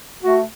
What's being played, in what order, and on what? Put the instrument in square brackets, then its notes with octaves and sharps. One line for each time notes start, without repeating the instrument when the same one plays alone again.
[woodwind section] A3 F#4